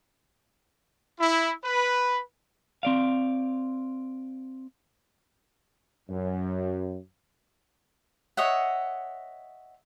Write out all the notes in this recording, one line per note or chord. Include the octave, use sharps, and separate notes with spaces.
E4
B4
C4 D5 F5
F#2
C#5 D#5 E5 F#5